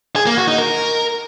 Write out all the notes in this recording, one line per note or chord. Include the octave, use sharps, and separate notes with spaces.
G#4
A#3
F#4
D#4
A#4